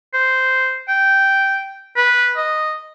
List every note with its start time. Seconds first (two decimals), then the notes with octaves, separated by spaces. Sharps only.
0.14 C5
0.89 G5
1.96 B4
2.37 D#5